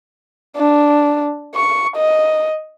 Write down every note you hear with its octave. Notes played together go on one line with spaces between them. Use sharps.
D4
C#6
D#5